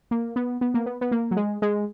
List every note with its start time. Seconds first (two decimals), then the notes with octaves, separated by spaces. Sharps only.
0.11 A#3
0.36 B3
0.61 B3
0.74 A#3
0.86 B3
1.01 B3
1.11 A#3
1.31 F#3
1.36 G#3
1.62 G#3